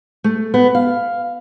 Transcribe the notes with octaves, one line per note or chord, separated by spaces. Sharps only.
A3
B3
F5